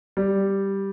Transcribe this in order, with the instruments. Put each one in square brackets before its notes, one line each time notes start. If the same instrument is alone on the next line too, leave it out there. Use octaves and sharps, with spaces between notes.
[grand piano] G3